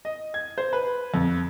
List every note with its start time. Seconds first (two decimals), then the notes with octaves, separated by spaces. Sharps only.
0.05 D#5
0.34 G#6
0.58 C5
0.73 B4
1.14 F2